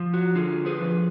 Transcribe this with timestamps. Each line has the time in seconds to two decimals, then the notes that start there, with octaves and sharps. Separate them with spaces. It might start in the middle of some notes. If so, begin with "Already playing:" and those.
Already playing: F3
0.14 F#4
0.35 D3 F4 G#4
0.66 G#4 B4
0.81 F3